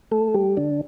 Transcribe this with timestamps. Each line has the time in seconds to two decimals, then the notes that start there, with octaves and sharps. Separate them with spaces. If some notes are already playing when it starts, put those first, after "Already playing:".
0.11 A3 A4
0.34 G3 G4
0.57 D3 D4